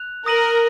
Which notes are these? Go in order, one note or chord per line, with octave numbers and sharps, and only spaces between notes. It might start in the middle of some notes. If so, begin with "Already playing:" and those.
Already playing: F#6 F7
A#4 D#6 A#6 D#7 F#7